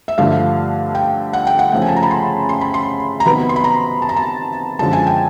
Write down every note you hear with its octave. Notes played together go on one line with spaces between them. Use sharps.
E5
G2 D3 F3 A3 F5
G5
F#5
G5
F#5
C#3 F3 A3 G5
G#5
A5
A#5
B5
C6
C6
B5
C6
A#5
C3 D#3 F#3 B3 B5
C6
B5
A#5
A5
A#5
A5
F#2 D3 F3 G#3 A5
G#5
G5